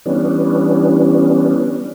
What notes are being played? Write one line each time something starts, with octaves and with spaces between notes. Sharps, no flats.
E3 G3 B3 C#4 D4